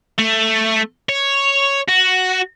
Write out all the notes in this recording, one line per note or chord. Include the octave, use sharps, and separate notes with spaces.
A3
C#5
F#4